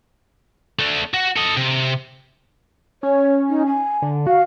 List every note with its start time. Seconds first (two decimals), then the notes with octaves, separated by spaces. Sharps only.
0.79 A3 D4
1.14 F#4
1.37 A4 D#5
1.57 C3
3.03 C#4 C#5
3.49 D#4
3.67 G#5
4.02 D3
4.27 F#4 F5